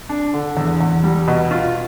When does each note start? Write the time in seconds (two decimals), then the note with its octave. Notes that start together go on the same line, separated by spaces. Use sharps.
0.09 D4
0.34 D3
0.57 E2
0.80 E2
1.04 G3
1.27 B2
1.51 F4